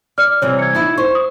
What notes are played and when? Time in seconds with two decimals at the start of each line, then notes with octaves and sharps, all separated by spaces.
0.18 D5 F6
0.42 C3 E3 G3 C#5
0.59 G#6 C#7
0.75 D#4 E4
0.98 C5 C#6
1.15 D#6